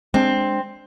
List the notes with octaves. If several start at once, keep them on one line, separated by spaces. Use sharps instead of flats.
G#3 C4 D4